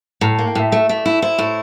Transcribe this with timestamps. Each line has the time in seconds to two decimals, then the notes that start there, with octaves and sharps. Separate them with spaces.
0.21 A2 A#5
0.35 A#3 A5
0.47 G5
0.55 A2 E5
0.72 A3 E5
0.89 A3 E5
0.97 D5
1.06 E4
1.22 E4 C5
1.38 A2